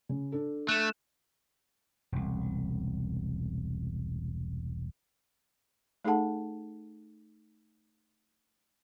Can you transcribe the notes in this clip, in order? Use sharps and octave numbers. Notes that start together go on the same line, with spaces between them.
C#3
D4 A4
A3 F#6 E7
E1 C2
A3 D#4 G#4 A4 F#5 A5